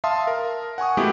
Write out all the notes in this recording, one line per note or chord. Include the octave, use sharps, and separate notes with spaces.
E5 F5 A5 C6 D#6
A#4
F#5 G#5 C#6 D#6
G#3 A3 B3 E4 F#4 G4